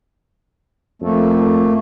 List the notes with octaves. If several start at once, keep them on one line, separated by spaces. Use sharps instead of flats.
F2 A3 A#3